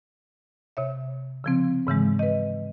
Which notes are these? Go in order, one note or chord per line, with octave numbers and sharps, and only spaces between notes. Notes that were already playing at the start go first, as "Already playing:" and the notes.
C3 C#5 E5
C#3 F3 C4
G#2 C#3 E3 G#3
B4 D#5